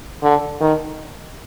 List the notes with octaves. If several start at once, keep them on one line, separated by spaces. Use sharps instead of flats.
D3
D#3